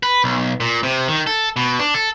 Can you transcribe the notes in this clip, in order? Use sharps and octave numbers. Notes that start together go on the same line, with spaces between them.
B4
B1
A#2
C3
D#3
A4
B2
D4
A4